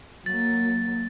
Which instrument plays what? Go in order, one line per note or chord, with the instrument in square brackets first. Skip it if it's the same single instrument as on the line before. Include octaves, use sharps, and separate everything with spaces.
[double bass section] F#3 A#3 [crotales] A6